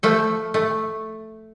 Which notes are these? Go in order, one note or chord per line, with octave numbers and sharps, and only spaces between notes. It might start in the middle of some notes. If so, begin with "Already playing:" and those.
F3 A3 A4
A3